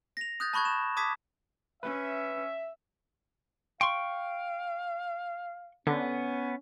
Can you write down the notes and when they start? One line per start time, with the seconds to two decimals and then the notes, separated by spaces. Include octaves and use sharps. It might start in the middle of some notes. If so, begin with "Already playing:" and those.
0.17 A#6 F7
0.40 D#6 F#6 G6 A6
0.53 A5 B5 C#6 F#6 G#6
0.65 E7
0.97 A5 D6 D#6 G#6 B6
1.83 C#4 B4 E5
3.81 F5 G5 C6 C#6
5.87 D3 B3 C#4